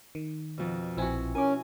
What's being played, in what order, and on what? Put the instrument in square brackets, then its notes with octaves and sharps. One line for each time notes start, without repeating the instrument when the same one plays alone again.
[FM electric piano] D#3
[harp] F2 B2
[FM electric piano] A#1 C4 G#5 [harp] E4 F#4
[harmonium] C#4 [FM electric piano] A#4 D6 [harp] G#5